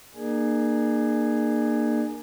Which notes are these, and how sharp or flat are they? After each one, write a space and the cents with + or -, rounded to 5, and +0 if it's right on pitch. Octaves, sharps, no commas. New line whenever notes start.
A#3 +0 D4 +40 G#4 +0